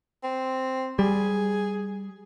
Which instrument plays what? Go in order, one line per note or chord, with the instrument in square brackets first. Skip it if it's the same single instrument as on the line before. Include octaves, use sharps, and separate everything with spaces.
[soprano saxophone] C4
[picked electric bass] G3 [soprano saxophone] G#4